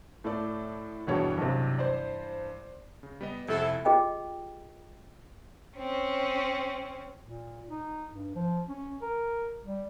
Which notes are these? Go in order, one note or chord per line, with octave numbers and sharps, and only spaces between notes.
A2 A3 A4 D5
E1 G2 B2 E3 D4 C#5
B1 C3
C5 D5
C#3
G3 B3 D#5
C2 F2 C3 E4 A4
F4 G4 G#4 D#5 G5
C4 C#4
A#2
D#4
G2
F3
C#4
A#4
G3